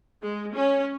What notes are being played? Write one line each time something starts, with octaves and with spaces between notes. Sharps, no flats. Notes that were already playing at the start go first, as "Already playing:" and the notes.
G#3
C#4